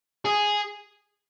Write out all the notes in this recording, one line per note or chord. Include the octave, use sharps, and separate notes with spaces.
G#4